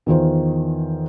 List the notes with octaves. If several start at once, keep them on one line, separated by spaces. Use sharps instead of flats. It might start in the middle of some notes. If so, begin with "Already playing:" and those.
E2 D#3 F4 C5